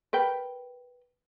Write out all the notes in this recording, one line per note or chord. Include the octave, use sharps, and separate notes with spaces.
A#4 B4 G5